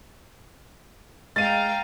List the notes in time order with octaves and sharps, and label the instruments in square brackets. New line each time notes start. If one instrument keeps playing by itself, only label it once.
[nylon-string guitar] G#3 [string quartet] F5 G5 A#5 [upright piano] A6 D#7